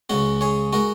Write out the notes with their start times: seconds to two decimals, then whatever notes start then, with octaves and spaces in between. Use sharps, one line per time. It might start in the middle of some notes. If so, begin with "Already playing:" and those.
0.10 C#2 C#3 G#3 C#4 F#4
0.41 G#4 C#5
0.73 G#3 F#4 A#4